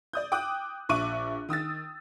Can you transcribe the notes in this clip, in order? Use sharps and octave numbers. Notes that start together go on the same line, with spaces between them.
D5 D#6 G6
G5 D6 D#6 F#6
A#1 E5 C#6 D6 F#6 D#7
D#3 D#6 E6 A6